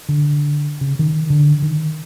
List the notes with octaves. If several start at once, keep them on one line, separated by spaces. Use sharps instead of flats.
D3
C#3
D#3
D3
D#3